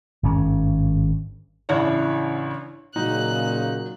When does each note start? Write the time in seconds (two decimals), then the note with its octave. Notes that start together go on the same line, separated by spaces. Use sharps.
0.23 G#1 G2 C#4
1.69 A1 C#3 D4 E4 C#5
2.96 A#2 C#3 F#3 D#4 F#6